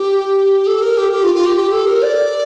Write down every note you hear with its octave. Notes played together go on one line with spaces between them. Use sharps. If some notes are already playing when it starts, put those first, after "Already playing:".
Already playing: G4
A4
A#4
G4
G4
F4
F4
G4
G4
A4
A#4
D5